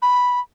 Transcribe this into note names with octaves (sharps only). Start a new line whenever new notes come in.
B5